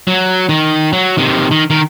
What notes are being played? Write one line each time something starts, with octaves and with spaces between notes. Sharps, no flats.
F#3
D#3
F#3
C3 D#3
D#3
D#3 A#4